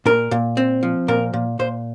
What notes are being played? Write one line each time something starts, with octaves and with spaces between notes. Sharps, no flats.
A#2 A#4
A#2
C4
F3
A#2 A#4
A#2
A#2 C5